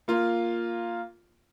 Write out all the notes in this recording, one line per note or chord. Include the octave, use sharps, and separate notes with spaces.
A#3 F4